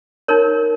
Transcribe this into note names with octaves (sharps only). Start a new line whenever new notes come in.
D#4 A#4 C#5